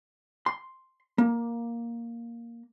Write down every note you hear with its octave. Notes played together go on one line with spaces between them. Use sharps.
C6
A#3